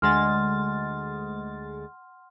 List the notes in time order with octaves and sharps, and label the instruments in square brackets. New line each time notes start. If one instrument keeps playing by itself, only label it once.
[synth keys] D2 G#3 A6 [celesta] F#5 C6 F6